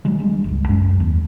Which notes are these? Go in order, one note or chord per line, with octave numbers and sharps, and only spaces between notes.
D#3 F#3 G#3
G3 G#3 D4
G1 C#2
F#2 G#3 C#4
D#2